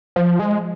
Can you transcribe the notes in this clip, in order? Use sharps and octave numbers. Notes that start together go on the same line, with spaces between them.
F3
G#3